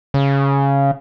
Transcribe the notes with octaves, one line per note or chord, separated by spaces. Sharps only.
C#3